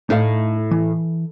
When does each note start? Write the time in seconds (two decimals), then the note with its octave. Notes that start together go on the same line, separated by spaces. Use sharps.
0.10 A2 D#4 A4 F5
0.71 E3